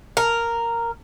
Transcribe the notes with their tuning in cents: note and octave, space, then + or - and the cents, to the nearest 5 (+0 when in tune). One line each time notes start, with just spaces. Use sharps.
A#4 -5